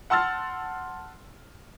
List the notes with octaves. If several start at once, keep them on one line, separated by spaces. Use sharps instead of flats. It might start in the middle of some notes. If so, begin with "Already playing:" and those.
F#5 A5 C6 E6 F6 A6